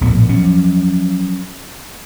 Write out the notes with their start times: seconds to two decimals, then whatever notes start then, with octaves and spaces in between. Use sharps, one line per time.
0.01 A#1 A2 B3
0.29 F3 F#3 C#4